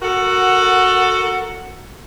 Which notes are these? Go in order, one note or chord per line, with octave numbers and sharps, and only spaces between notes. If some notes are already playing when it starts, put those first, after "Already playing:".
F#4 A4 A#4 F#5